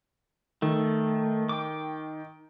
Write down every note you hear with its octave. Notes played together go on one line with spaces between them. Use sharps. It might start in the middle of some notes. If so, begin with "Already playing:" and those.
D#3 A3
G5 D6